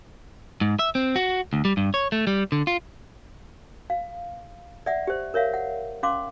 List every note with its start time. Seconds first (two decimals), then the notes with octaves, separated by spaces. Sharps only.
0.61 G#2
0.79 E5
0.95 C4
1.16 F#4
1.53 D2
1.65 G3
1.77 G2
1.94 C#5
2.12 A3
2.27 G3
2.52 D3
2.67 F4
3.90 F5
4.86 D5 E5 F#5
5.07 G4 C5
5.34 A#4 C#5 E5 F5
5.54 F#5
6.03 C#4 F5 C6 D6